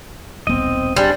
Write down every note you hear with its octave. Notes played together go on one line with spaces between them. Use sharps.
D#1 B1 B3 C4 D#5
G3 D4 G#4 C5